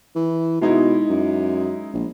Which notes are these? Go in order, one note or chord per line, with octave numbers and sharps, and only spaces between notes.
E3
B2 G#3 D#4 E4
F#2
A#1